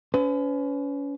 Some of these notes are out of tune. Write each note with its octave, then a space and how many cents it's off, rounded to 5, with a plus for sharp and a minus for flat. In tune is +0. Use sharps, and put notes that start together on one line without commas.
C#4 +30 B4 +40